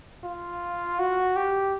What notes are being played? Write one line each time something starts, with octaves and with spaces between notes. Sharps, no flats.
F4
F#4
G4